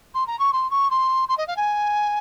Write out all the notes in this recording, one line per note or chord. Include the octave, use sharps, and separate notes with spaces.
C6
A#5
C#6
C6
C#6
C6
C6
D#5
F5
G#5